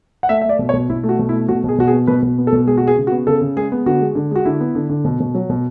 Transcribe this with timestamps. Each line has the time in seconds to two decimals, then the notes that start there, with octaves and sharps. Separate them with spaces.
0.23 F#5
0.29 A3 E5
0.41 E5
0.45 A3 D5
0.59 B2
0.69 C#5
0.74 B2
0.90 B2 E4
1.03 A3
1.09 F#4
1.19 B2
1.29 E4
1.33 A3
1.49 B2 F#4
1.64 B2 G#4
1.79 B2 F#4
1.88 G#4
1.93 B3
2.07 B2 B4
2.23 B2
2.38 B3
2.47 A4
2.53 B2
2.67 G#3 G#4
2.78 F#4
2.82 G#3
2.87 G#4
2.97 C#3
3.07 F#4
3.12 B3
3.27 C#3 A4
3.41 C#3
3.56 G#3 G#4
3.72 B3
3.86 D3 F#4
4.01 G#3
4.15 D3
4.31 G#3 F#4
4.45 D3 E4
4.61 B3
4.75 D3
4.89 D3
5.05 B2
5.20 B2
5.35 F#3
5.50 B2